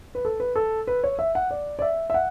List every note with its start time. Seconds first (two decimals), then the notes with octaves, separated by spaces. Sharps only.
0.15 B4
0.25 A4
0.40 B4
0.56 A4
0.87 B4
1.04 C#5
1.19 E5
1.35 F#5
1.51 D5
1.79 D5
1.82 E5
2.10 E5
2.14 F#5